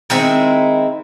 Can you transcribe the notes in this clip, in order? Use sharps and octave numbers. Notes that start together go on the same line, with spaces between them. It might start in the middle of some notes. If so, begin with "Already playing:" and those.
D#3 G#3 C4 E4